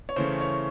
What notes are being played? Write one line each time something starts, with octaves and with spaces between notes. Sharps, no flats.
C#5
C#3 E3 A3 C#4 C5
C#5